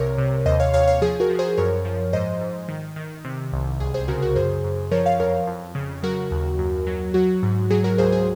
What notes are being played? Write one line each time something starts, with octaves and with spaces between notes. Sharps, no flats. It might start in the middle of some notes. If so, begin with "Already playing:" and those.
Already playing: C2 C3 A#4 C#5
C3
D#2 C5 D#5
C#5 F5
D#2 C#5 F5
C#5 F5
F3 G#4
F#4 A#4
F3
G#4 C5
F#2 A#4 C#5
F3
G#2 C5 D#5
G#2
D#3
D#3
C3
C2
C#2 G#4
G#4 C5
C#3 F#4 A#4
F#4 A#4
F#2 G#4 C5
F#2
F3 A#4 C#5
C#5 F5
F2 A#4 C#5
F2
C#3
F#3 F#4 A#4
D#2
F#2
F#3
F#3 F#4
G#2
F#3 G#4
F#4 A#4
C#2 G#4 C5
G#4